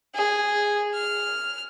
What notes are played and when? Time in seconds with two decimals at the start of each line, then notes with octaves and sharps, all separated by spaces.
0.15 G#4
0.94 F6